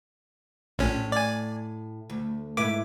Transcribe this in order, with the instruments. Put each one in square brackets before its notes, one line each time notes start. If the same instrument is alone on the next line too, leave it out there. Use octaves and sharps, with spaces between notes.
[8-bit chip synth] A#1 C#4 [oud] A2
[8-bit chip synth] D5 G#5
[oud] D2
[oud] G#2 E4 B4 [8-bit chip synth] D6